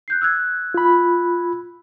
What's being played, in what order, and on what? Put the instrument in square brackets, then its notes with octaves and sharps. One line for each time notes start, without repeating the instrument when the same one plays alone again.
[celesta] F#6 G6 C7
E6 F#6 G#6
[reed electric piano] F4 B5